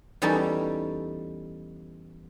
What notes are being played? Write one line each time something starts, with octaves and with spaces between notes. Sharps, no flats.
E2 G3 C#4 D#4 A4 A5